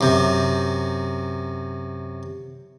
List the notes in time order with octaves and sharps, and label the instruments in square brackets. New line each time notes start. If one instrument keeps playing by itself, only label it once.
[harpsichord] F#2 C3